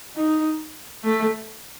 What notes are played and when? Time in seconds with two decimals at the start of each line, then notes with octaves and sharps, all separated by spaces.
0.16 D#4
1.04 A3